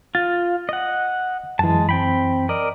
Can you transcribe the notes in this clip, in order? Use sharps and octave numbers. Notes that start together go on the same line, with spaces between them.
F4 A6
D#5 F#5
F#2 E3 G#3 A5
C4 G5 B5
A#4 D5 D#5